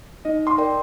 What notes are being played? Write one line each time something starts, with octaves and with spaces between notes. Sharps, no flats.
D#4 D#5
C6
A#4 D5 G5